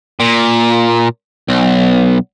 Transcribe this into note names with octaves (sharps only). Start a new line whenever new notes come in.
A#2
B1